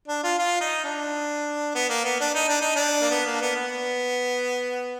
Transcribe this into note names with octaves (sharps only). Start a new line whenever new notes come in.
D4
F4
F4
D#4
D4
B3
A#3
B3
D4
D#4
D4
D#4
D4
A#3
B3
A#3
D4
B3
B3